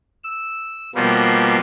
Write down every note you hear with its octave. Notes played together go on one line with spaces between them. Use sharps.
E6
B2 F3 G3 A#3 B3